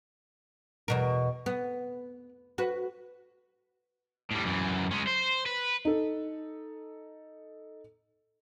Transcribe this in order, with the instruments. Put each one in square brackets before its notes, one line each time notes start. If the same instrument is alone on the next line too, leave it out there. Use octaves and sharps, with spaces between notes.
[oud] E2 B2 A#4
B3
F#4 B4
[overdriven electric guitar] A2 G3
F#2 E3
G#3 C#4
C5
B4
[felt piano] D#4 A4